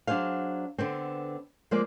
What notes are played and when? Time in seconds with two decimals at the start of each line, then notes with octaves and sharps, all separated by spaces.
0.07 F#3 D4 G#4 C5 F5
0.78 D3 B3 C4
1.71 F3 G#3 A#3 C5 D5